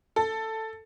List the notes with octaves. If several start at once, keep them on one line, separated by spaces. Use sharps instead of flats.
A4